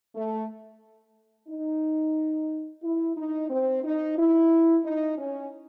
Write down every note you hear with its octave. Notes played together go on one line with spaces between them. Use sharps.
A3
D#4
E4
D#4
C4
D#4
E4
D#4
C#4